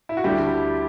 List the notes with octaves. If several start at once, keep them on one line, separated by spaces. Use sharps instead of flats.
E4
F#4
D2 D3 G3 E4 G4